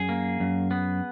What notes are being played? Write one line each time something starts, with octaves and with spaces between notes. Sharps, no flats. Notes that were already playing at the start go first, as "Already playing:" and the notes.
Already playing: F#2 G#4
A#3
F#2
B3